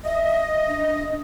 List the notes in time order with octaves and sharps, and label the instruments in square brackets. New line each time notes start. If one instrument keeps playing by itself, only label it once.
[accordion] D#5 [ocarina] E5
[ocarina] D4